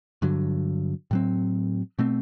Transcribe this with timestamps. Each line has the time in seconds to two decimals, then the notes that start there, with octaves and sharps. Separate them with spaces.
0.22 G2 D3 F#3
1.11 A2 F#3 C4
1.99 B2 A3 C4